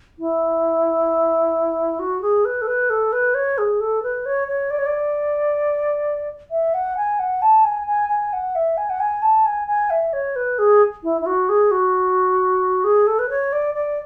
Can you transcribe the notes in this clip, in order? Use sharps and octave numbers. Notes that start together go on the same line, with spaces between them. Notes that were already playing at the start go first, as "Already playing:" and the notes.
E4
F#4
G#4
B4
A4
B4
A4
B4
C#5
G#4
A4
B4
C#5
C#5
D5
C#5
D5
E5
F#5
G#5
F#5
A5
G#5
G#5
G#5
F#5
E5
G#5
F#5
G#5
A5
G#5
G#5
E5
C#5
B4
G#4
E4
E4
F#4
G#4
F#4
G#4
A4
B4
C#5
D5
D5